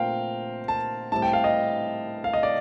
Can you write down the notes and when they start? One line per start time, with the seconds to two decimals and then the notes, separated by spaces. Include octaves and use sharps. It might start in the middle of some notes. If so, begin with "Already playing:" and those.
Already playing: A#2 A3 C4 A#4 C5 F5 G5
0.68 A5
1.12 A2 G3 C4 A5
1.22 G5
1.33 F5
1.44 D#5
2.24 F5
2.33 D#5
2.43 D5